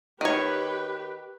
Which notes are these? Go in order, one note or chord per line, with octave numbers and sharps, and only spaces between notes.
D#3 G4 B4 C#5